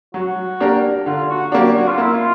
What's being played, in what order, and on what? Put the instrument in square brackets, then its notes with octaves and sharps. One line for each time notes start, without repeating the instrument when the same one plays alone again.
[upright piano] F#3 [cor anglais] F#4
[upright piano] A#3 D4 G4 A#4
[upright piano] D3 [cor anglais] F4
[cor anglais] F#4
[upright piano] F#3 A#3 D4 [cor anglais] G4
[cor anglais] F#4
F4
[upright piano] A#3 [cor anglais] E4
[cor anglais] F4